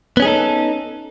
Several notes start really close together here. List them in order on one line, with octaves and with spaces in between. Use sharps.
B3 C#4 G#4 D#4 A4